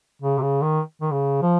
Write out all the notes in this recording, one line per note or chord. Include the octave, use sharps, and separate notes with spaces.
C#3
C3
C#3
D#3
D#3
C#3
F3